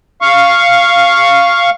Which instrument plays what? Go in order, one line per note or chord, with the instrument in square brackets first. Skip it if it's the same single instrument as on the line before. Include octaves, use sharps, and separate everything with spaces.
[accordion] F5 C#6